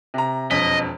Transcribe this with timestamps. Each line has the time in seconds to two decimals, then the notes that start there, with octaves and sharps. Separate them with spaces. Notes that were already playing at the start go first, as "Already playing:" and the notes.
0.14 C3 A#5
0.51 E1 F2 D#5 B6